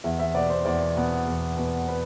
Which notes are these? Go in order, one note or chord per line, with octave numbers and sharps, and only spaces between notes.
E2 E5
E5
B2 B3 D5
C5
E2 D5
B2 B3
E2
B2 B3
B4